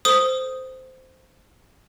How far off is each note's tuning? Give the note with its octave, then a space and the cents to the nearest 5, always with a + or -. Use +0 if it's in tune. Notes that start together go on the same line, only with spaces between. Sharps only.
A4 +5 C5 -10 D#6 +0